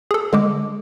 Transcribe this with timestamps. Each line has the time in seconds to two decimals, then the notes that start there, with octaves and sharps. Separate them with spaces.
0.11 G#4 A4
0.33 D3 G#3 D6